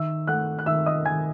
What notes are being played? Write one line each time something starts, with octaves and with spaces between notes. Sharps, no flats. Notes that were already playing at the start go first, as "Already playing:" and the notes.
Already playing: D#3 E5 E6
A3 F#5 F#6
F#6
D#3 E5 E6
D#5 D#6
D#3 G#5 G#6